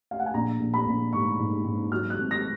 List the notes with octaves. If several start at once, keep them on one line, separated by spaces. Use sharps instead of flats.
F5
F#5
G#5
A#1 A#5
A#1
B5
A#1
G#2 C#6
G#2
G#2
F#3 F6
F#6
G#1
A#6